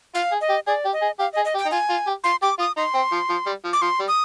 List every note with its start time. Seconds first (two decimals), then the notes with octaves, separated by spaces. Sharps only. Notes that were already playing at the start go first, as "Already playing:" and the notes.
0.15 F4 F5
0.32 G#4
0.41 D#5
0.49 G4
0.67 G#4 D5
0.85 G4
0.93 D#5
1.02 G#4
1.19 G4 F5
1.33 D#5
1.37 G#4
1.45 D#5
1.54 G4
1.58 G5
1.66 D#4
1.71 F4 G#5
1.90 F4
2.07 G4
2.24 F4 C6
2.42 G4 D6
2.59 F4 D#6
2.77 D#4 C6
2.94 C4
3.12 F3
3.30 F3
3.46 G3
3.65 F3
3.73 D6
3.82 F3 C6
3.99 G3
4.08 D#6